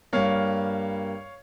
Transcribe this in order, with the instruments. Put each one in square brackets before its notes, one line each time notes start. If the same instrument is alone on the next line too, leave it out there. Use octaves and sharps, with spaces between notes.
[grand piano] G2 G3 A#3 C#5 F5